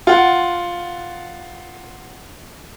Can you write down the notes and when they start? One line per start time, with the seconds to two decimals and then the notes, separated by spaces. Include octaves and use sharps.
0.07 F4 F#5